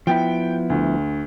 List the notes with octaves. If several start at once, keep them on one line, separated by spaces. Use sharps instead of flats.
F3 B3 E4 G5
D2